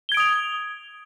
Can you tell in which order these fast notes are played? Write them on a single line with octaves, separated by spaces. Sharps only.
G7 G#6 D7 D#6 F7